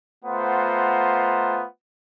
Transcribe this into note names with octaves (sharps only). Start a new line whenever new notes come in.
A3 B3 F4 C5 F#5 A#5